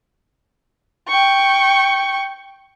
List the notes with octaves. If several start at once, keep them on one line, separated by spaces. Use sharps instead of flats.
G5 C#6